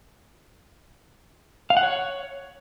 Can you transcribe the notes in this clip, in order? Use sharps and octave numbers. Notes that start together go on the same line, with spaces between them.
F5
F#5
C#5